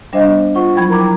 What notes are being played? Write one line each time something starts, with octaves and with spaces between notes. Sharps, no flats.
G3 D4 C5 D#5 F5
B3
F4 C5 F#5 C#6
F3 F#3 E4 G5 B5 G#6
A#4 A#5 D6